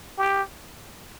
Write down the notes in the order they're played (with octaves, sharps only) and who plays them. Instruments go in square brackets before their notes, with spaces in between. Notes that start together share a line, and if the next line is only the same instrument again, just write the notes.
[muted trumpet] G4